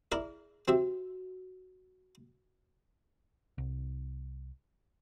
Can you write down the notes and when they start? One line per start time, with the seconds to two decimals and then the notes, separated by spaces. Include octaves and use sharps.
0.12 E4 G#4 A#4 D5
0.68 C4 F#4 G4 E5
3.58 C2